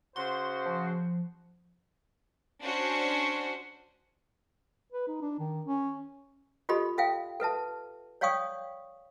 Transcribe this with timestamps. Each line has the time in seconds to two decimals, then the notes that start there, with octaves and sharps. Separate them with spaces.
0.16 C#3 F#4 C5 C6
0.66 F3
2.63 C#4 D4 F#4 C5
4.92 B4
5.08 D#4
5.22 D4
5.39 D#3
5.67 C#4
6.69 F4 G4 A4 D#5 B5 C6
6.98 A4 E5 F5 G5
7.40 A4 B4 E5 A5
8.21 C#5 D5 F5 G5 C#6 D#6